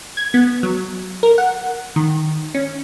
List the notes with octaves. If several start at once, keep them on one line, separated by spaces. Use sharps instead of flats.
G#6
B3
F#3
A#4
F#5
D#3
C#4